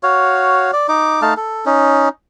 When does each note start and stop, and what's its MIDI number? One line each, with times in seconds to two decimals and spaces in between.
0.03 0.71 66
0.03 0.71 73
0.03 0.71 77
0.73 0.87 74
0.88 1.22 63
0.88 1.22 86
1.22 1.34 57
1.22 1.34 63
1.22 1.34 77
1.22 1.34 81
1.37 1.65 69
1.66 2.09 61
1.66 2.09 63